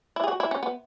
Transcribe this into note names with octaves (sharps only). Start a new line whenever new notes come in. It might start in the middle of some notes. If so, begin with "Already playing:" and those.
E4
G#4
F#4
E4
C#4
B3